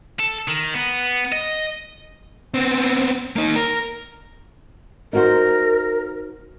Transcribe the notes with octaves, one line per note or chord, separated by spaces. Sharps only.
A4
D#3
B3
D#5
B3 C4
A#3 D#4
A#4
D#4 F#4 A#4 C5